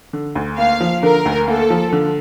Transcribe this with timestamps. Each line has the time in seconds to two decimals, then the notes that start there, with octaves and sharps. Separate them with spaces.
0.13 D3
0.35 D2
0.58 A#3 F5
0.81 F3
1.03 D3 A#4
1.26 D2
1.48 A#3 A4
1.70 F3
1.93 D3